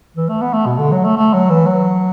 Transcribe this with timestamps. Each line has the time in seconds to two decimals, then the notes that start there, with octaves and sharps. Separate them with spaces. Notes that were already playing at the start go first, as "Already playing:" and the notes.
0.17 E3
0.29 A3
0.42 B3
0.53 A3
0.66 B2
0.78 D3
0.92 F#3
1.04 A3
1.17 A3
1.33 F#3
1.50 E3
1.66 F#3